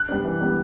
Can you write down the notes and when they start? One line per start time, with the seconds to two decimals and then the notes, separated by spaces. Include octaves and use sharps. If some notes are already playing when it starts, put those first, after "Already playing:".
Already playing: F#6
0.09 G3 B3 D4
0.25 E3
0.40 G3 B3 D4